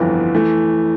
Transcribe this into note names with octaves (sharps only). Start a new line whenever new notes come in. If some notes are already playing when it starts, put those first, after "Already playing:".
Already playing: G1 F2 E3 B3 F4
E3 A3